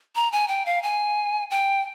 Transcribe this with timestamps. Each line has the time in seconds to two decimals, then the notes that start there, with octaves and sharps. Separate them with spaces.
0.16 A#5
0.32 G#5
0.48 G5
0.66 F5
0.83 G#5
1.51 G5